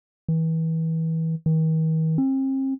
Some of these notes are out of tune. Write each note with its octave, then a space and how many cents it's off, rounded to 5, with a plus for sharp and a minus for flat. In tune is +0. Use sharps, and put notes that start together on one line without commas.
E3 -30
D#3 +45
C4 +40